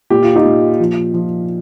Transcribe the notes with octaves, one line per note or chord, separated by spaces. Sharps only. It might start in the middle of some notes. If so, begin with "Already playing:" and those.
A#2 G4
F4
D#4 G4
A#2
F3
F3